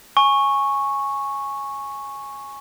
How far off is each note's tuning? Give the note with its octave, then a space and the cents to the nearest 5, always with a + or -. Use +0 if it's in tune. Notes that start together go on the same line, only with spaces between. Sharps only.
G#5 +0 C#6 -10